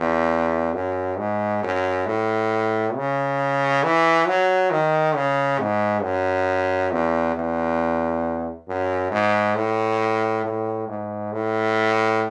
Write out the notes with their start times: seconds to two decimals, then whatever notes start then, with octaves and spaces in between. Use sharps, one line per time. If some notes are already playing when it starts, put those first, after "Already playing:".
Already playing: E2
0.74 F#2
1.18 G#2
1.63 F#2
2.06 A2
2.95 C#3
3.84 E3
4.27 F#3
4.71 D#3
5.16 C#3
5.60 G#2
6.03 F#2
6.92 E2
7.35 E2
8.68 F#2
9.12 G#2
9.56 A2
10.45 A2
10.88 G#2
11.32 A2